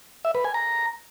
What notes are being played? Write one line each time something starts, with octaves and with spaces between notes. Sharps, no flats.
E5
B4
G#5
A#5